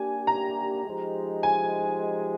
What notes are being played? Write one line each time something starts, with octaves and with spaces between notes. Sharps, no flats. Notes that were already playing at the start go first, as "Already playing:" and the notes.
Already playing: A#3 D4 G4 G#5
A#5
F3 G#3 D#4 G4 C5
G#5